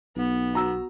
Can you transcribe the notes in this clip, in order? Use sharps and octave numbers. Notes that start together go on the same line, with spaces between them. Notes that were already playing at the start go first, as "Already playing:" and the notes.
B1 B3
F#4 A#5 E6